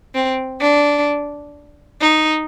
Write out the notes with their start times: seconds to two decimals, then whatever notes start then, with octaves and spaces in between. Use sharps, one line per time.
0.14 C4
0.61 D4
2.01 D#4